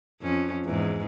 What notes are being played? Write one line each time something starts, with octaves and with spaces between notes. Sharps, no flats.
F2 C#4
E2 G#2